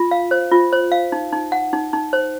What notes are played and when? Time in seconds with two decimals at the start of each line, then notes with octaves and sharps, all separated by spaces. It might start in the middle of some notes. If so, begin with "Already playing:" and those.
Already playing: F4
0.11 F5
0.31 C5
0.52 F4
0.73 C5
0.92 F5
1.12 D#4
1.33 D#4
1.52 F#5
1.73 D#4
1.93 D#4
2.13 C5